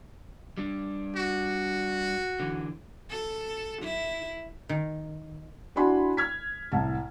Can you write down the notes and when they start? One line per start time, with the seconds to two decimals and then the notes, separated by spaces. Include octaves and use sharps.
0.57 G3 D4
1.16 F#4
2.40 D3 E3
3.10 A4
3.82 E4
4.69 D#3
5.76 D4 E4 F#4 G#5 B5 C6
6.17 F6 G#6 B6
6.72 C2 A2 A5